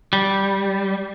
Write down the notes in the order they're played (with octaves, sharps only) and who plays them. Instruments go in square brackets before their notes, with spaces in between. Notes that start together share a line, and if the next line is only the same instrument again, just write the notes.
[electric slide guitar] G3